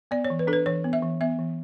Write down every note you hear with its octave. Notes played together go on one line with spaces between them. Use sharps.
B3 D5
C#5
E3
B4
D4 A4
B4
E3 C#5
B3
E5
E3
B3 E5
E3